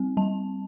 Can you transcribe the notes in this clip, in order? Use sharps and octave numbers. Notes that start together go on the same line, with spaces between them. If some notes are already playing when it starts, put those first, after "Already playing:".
Already playing: G3 C4
G3 A5